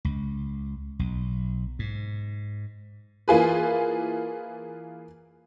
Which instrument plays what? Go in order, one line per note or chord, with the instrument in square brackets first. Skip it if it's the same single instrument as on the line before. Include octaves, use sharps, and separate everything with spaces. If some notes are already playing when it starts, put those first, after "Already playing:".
[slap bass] C#2
B1
G#2
[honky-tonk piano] E3 A#3 F4 G#4 B4